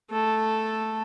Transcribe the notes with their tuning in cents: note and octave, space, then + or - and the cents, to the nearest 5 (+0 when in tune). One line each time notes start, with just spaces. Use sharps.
A3 +0 A4 +0